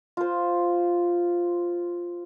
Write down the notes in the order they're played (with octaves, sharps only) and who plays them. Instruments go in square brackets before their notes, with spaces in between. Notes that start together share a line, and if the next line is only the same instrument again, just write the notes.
[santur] F4 C5